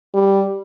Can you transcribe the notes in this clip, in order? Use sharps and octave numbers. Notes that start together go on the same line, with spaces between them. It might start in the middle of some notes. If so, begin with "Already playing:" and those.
G3